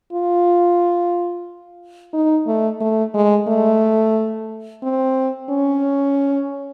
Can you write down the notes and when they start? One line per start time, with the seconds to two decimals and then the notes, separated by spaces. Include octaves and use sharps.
0.13 F4
2.13 D#4
2.47 A3
2.80 A3
3.14 G#3
3.48 A3
4.83 C4
5.50 C#4